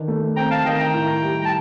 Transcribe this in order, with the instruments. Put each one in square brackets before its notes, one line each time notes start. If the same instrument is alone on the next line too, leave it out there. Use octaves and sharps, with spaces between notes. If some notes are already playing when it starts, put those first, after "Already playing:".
Already playing: [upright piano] D#3 D4
A3
[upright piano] C4 [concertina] G5 A#5
[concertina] F5 A5
[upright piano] D#3 [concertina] D#5 G5
[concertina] G5 A#5
[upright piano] A2
G3
[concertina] A5